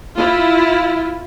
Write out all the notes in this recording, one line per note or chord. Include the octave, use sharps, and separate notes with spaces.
E4 F4